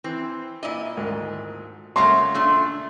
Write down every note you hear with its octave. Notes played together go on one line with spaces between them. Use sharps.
E3 C4
A#2 E4 D5 D#5
D2 G#2 D#3
C#2 F#3 A3 A#3 C#5 E5 C6
A#2 A3 D4